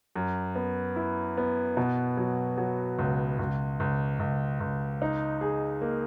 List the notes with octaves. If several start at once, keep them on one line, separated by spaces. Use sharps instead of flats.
F#2
B3
E4
B3
B2
F#3
F#3
C#2
C#2
C#2
C#2
C#2
D#4
G#4
A#3